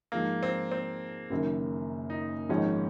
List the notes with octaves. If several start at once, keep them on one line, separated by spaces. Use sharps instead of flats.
G#2 F3 G#3 A#3
C4
C4
F#1 F#2 D#3
D#4
G#1 G#2 F3 C#4